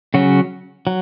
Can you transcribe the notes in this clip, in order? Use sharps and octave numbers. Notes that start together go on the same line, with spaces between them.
C#3 F#3 C#4 F#4
F#3